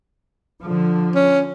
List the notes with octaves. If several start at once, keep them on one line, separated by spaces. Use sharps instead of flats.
D3 F3
C#4